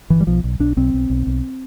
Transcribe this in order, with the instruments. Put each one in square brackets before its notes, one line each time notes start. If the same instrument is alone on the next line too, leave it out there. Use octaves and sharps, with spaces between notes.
[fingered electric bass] G1 E3
G3
B1 F3
B1
B1 D4
B1 C4
B1
B1
B1